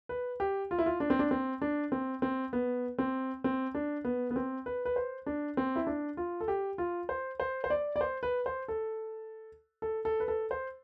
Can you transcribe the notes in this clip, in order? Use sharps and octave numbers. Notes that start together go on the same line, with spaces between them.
B4
G4
F4
E4
F4
D4
C4
D4
C4
D4
C4
C4
B3
C4
C4
D4
B3
B3
C4
B4
B4
C5
D4
C4
E4
D4
F4
A4
G4
F4
C5
C5
C5
D5
D5
C5
B4
C5
A4
A4
A4
B4
A4
C5